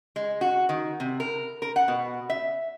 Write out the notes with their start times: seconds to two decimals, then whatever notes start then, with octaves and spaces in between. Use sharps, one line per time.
0.16 G#3
0.41 F#4
0.69 D#3
1.00 C3
1.20 A#4
1.62 A#4
1.76 F#5
1.88 B2
2.30 E5